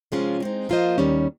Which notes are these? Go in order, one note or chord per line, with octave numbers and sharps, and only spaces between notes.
C3 F3 G#3 C#4 F4
G#3 C4 D#4
F3 A#3 F4 C5 D#5
D#2 D#3 G3 C#4